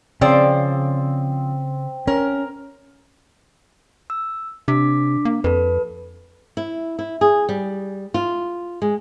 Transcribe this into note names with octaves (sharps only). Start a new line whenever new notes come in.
C#3 F3 C4 C5 D5
C#4 A#4
E6
C3 D4 D6 B6
A#3
F2 A4 B4
E4
E4
G#4
G3
F4
G#3